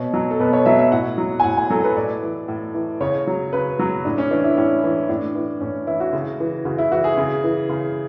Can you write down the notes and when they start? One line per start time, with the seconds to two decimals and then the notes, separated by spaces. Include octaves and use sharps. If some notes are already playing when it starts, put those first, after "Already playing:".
Already playing: B2 C#5
0.14 F#3
0.31 A4
0.40 B2 B4
0.53 C#5
0.66 F#3 E5
0.79 E5
0.92 A2 F#5
1.18 F#3
1.40 G#5
1.44 A2 F#5
1.57 G#5
1.70 F#3 A4
1.84 B4
1.96 A2 D5
2.23 E3
2.48 A2
2.74 E3
3.01 C#3 C#5
3.27 F#3
3.53 C#3 B4
3.79 F#3
4.05 A2 D4
4.18 C#4
4.31 E3 D4
4.44 E4
4.57 A2 C#4
4.83 E3
5.09 A2 D4
5.35 E3
5.61 A2 C#4
5.87 E3 E4
6.00 F#4
6.13 C#3
6.40 E3
6.65 C#3 F#4
6.78 E4
6.91 E3 F#4
7.04 G#4
7.17 C#3
7.44 E3
7.69 C#3